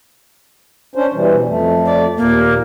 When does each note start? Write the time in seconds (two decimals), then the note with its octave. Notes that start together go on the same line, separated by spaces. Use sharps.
0.95 C#4 D4 C5
1.14 B2 E3 G3
1.47 F2 A3
1.86 D5
2.17 D#2 A#2 A#3